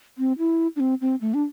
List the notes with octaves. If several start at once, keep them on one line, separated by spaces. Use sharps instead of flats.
C4
E4
D4
C4
C4
A3
D4